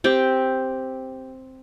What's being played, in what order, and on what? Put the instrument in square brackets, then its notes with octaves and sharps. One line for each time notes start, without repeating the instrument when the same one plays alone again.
[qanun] C4 G4